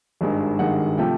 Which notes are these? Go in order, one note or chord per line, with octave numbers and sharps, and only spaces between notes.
G#1 G2 D#3 G#3
G#1 G2 D#3 G#3 F#5
C3 F3 A3 G5